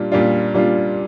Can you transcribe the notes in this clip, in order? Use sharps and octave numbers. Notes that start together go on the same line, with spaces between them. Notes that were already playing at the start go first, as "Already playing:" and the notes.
Already playing: A#2 G3 D4 F4
A#2 G3 D4 F4
A#2 G3 D4 F4